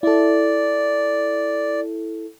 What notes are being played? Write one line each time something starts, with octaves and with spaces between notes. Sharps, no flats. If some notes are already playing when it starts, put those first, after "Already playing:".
E4 A4 D5